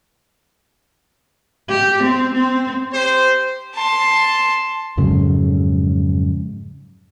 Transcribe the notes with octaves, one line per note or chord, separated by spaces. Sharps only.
G4
C4
C4
G4 C5
A5 C6
F2 G#2 C#3 F#3